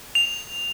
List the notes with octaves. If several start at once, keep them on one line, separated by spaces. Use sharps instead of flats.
F7